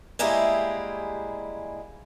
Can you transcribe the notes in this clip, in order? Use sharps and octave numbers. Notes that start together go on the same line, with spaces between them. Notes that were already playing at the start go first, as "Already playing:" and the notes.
G3 G#3 A#3 E4 G4 G#4